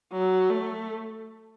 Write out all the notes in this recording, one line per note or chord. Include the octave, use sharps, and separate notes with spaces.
F#3
A3